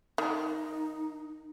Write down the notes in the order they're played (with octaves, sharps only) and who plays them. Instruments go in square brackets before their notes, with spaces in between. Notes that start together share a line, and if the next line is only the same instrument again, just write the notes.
[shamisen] D#3 [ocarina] D#4